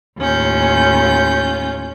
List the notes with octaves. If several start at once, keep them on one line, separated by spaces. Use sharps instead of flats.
D#2 A2 C#4 F4 G6